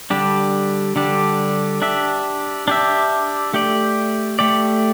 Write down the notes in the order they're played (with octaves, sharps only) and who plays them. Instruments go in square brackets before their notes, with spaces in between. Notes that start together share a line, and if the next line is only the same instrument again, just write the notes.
[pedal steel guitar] D3 G3 D4 G4
D3 G3 D4 G4
D4 G4 E5
D4 G4 E5
A3 G4 D5
A3 G4 D5